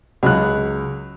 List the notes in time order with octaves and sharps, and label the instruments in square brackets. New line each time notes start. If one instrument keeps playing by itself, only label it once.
[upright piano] C#2 [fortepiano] F#3 F#6